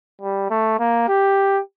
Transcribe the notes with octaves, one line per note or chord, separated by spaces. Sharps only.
G3
A3
A#3
G4